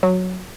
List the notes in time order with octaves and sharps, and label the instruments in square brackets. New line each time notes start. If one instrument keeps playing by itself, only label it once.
[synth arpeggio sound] F#3